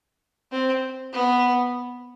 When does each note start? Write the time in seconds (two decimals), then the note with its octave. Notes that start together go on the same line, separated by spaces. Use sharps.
0.52 C4
1.13 B3